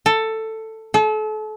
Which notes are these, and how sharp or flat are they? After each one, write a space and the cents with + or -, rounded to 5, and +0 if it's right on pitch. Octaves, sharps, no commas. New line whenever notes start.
A4 +10
A4 -35